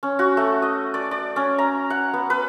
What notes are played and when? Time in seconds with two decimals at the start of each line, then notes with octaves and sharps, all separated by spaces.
0.03 C#4
0.19 F#4
0.37 A3
0.62 D#5
0.94 D5
1.11 D5
1.36 C#4
1.58 A#5
1.90 F#5
2.13 B3
2.30 B4